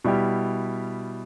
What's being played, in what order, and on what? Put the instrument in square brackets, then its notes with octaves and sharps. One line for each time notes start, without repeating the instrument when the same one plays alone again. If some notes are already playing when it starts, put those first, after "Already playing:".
[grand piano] B2 G3 E4 G4